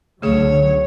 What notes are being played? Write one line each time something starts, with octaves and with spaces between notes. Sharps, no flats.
C#2 D3 F#3 A3 G#4 C#5